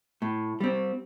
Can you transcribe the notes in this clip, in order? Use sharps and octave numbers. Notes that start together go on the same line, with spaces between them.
A2
G3 C4